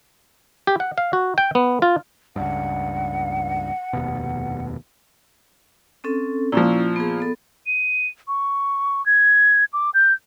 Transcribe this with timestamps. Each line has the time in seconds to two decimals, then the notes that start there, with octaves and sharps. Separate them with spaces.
0.67 G4
0.80 F#5
0.98 F5
1.13 F#4
1.38 G5
1.55 B3
1.82 F4
2.36 C#2 G2 F#5
3.93 F1 D#2 B2
6.04 C4 C#4 A4
6.52 A#2 F3 C#4 E4
6.96 B3 G#4
7.20 B3 A4
7.66 D#7
8.28 C#6
9.06 G#6
9.73 D6
9.94 G6